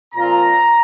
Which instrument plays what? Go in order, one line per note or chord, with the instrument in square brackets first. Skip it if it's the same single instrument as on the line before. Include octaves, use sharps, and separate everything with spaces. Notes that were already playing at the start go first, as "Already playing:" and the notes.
[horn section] A#2 F3 C4 F4 A#5